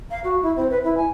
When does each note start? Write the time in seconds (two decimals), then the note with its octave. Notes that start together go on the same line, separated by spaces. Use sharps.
0.11 F5
0.24 F#4
0.42 E4
0.56 C4
0.70 B4
0.84 E4
0.97 G#5